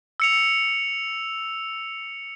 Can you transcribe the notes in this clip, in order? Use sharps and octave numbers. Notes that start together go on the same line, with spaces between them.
E6 C#7 F7